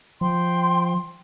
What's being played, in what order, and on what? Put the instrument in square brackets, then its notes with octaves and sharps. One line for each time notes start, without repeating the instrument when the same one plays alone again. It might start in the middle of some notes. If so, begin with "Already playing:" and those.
[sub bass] F3 [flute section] G5 C6